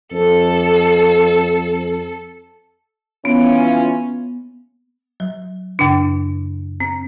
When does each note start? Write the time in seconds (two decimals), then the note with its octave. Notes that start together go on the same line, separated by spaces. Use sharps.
0.13 F2 A4
3.25 E3 B3 C#4 F4
5.20 F#3
5.79 F#2 C#3 D4
6.80 C4